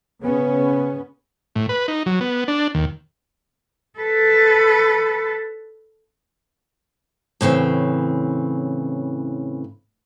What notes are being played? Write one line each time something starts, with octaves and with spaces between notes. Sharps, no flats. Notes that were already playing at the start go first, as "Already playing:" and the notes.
C#3 B3 C#4
A2
B4
D#4
F#3
B3
D4
D#2
A4 B4
A2 C#3 E3 C4